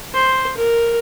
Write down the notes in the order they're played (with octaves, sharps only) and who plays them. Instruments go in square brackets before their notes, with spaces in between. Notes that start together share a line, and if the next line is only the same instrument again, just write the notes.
[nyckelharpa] C5
A#4